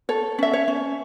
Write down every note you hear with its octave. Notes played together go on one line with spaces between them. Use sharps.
A4 C#5
C#4 E5
C#5
C#4